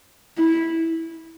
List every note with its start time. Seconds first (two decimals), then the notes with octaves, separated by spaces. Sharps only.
0.37 E4